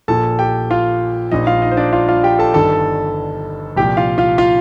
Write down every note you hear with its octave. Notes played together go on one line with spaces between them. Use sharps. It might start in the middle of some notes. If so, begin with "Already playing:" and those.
A#1 A#2 F3 A4 A5
G4 G5
F4 F5
A#1 A#2 F3 D#4 D#5
F4 F5
D#4 D#5
C5
D4 D5
F4 F5
F4 F5
G4 G5
A4 A5
G1 G2 D#3 A4 A5
C2 A#2 F3 G4 G5
F4 F5
F4 F5
F4 F5